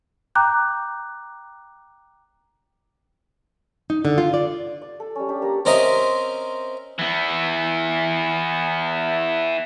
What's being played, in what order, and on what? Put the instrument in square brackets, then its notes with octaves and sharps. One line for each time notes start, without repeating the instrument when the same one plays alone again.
[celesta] G5 A#5 D6 F#6 G6
[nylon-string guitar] D#4
D3
F4
D5
[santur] D5
A4
G3 C#4
D4 G4
A#3 A4 A#5
[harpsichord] C4 C#4 A#4 C5 D#5 E5
[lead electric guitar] E3 B3